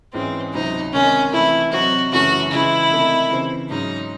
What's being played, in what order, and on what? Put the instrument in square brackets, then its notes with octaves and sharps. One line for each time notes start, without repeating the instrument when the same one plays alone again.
[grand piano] G#2 E3 G#3 C#4 [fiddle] C4
[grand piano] C#2 C3 F#3 C4 [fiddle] D#4
[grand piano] C3 D#3 G#3 D#4 [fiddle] C#4
[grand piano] C3 E3 A3 [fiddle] E4
[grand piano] C3 F#3 C4 D#4 [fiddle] F#4
[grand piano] F#2 C#3 E3 A3 C#4 [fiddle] F#4
[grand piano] C#3 E3 G#3 [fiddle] E4
[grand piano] C3 D#3 A3 D#4
C#3 E3 C4
[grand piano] G#2 F#3 C#4 [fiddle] D#4